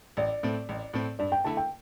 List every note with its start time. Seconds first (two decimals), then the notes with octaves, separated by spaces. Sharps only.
0.17 A1 D5
0.43 A2 A3 C4
0.69 A1
0.94 A2 A3 C4
1.19 G2 D5
1.32 G5
1.45 D3 A3 E4 A5
1.57 G5